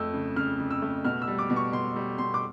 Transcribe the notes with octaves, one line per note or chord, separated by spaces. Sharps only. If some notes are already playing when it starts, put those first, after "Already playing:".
Already playing: F2 A3 E6
C#3
C#3 F6
C#3
E6
A3
B2 F6
E6
G3
D6
B2
C#6
B2 C6
G3
B2 C6
D6